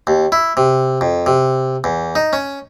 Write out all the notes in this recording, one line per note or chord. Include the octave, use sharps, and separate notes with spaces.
D#2
E4
C3
F2
C3
E2
D#4
C#4